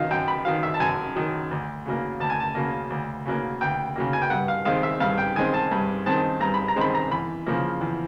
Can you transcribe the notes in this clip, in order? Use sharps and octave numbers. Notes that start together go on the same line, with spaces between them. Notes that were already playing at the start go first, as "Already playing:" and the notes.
Already playing: D#3 F#3 D#5 F5
F#2 G5
B5
D#3 F#3 F5
E5
A5
F#2 G#5
D#3 F#3
D2
C#3 F#3 A#3
D2 A5
G#5
A5
C#3 F#3 A#3
D2
C#3 F#3 A#3
D2 G5
C#3 F#3 A#3
G#5
G5
G2 F#5
F5
D#3 G#3 C4 F5
E5
G2 F5
G5
D#3 G#3 C4 G#5
A5
G2
D#3 G#3 C4 A5
G2 A#5
B5
A#5
D#3 G#3 C4 B5
A#5
E2 B5
C#3 F3 A#3
E2